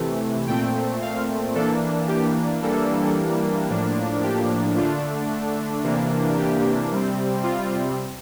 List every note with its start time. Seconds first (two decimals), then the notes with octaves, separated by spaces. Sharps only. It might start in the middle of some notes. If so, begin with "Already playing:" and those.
Already playing: C3 E3 A3
0.47 A#2 A3 C4 G5
1.02 F5
1.55 E3 A#3 D4 A4
2.08 G4
2.62 E3 G3 A#3 D4 A4
3.69 A2 F3 A#3 D4
4.23 G4
4.76 D3 A3 D4 F4
5.83 C3 E3 A#3 D4
6.38 G4
6.91 C3 G3 C4
7.43 F4